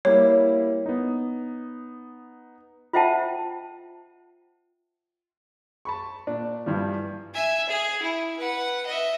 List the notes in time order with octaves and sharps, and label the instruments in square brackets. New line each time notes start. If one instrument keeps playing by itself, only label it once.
[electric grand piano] G3 A#3 E4 [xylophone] C#5
[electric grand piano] B3 D#4
[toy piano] F4 C5 E5 F#5 G5 A5
[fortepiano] A5 B5 C#6
A#2 D4
G2 E3 F3 G3
[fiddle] E5 G#5
G#4
E4
B4 F#5
D#5 E5